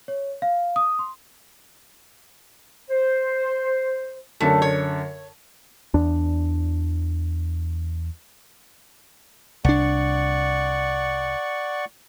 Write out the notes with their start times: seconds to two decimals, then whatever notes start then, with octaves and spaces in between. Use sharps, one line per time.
0.08 C#5
0.42 F5
0.76 D#6
0.99 C6
2.89 C5
4.40 F#2 D3 A3 C#4
4.62 C#5
5.94 E2 D4
9.65 C2 D4 D5 F#5 C#6